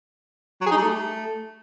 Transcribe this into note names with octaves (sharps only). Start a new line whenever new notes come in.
F#3
G#4
D#4
G3
A3